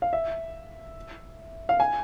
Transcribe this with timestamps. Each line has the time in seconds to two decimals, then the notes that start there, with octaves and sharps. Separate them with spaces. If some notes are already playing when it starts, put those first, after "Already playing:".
0.02 F5
0.13 E5
1.69 F5
1.80 G#5